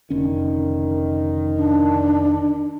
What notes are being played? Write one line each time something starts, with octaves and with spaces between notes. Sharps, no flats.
F1 D3 D#3 C#4
D4